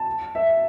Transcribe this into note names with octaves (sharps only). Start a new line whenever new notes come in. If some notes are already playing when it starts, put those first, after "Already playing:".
Already playing: A5
E5